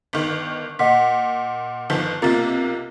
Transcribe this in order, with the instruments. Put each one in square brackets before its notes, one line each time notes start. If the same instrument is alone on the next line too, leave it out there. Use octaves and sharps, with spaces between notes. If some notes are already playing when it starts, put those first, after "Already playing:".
[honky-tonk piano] G1 D#3
[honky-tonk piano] A#2 [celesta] D#5 F#5 B6
[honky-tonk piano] G1 D#3 F3
[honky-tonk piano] B1 C3 A#3 [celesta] F4 A#5 A6